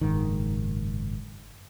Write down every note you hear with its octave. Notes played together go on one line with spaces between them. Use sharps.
F#1 G#2 D#3